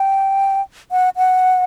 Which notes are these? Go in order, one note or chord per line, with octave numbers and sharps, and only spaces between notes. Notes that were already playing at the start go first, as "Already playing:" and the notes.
Already playing: G5
F#5
F#5